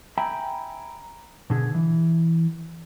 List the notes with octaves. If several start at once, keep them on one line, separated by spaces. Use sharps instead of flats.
E5 G5 G#5 A#5 B5
B2 D3 G#4
E3